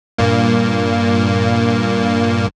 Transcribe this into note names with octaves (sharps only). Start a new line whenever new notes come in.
G2 A#2 A#3